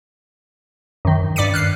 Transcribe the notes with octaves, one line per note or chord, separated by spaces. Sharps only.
F#2 D#3
G2 D5 D6 B6 C#7 D#7
F6 F#6 C7